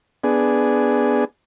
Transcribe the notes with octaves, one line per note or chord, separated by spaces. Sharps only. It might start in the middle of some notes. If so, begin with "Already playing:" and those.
B3 D4 G#4